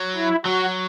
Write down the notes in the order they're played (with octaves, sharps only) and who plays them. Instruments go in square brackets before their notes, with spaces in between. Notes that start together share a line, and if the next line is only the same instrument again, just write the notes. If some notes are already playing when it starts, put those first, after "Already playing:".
Already playing: [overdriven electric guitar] F#3
[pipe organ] E4
[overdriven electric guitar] F#3 [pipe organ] F#4